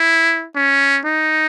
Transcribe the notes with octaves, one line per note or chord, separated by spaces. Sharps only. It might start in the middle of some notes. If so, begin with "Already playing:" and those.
Already playing: E4
C#4
D#4